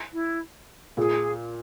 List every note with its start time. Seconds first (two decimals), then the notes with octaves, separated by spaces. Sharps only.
0.13 E4
0.97 A#2 G#4